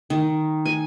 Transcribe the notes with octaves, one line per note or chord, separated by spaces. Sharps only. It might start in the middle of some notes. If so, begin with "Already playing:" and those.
D#3
G#5